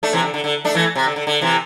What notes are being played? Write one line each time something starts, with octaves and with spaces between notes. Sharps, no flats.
A3 D4
C3 E3
D3
D3
D3
A3 D4
E3 A3
C3
D3
D3
D3
C3 E3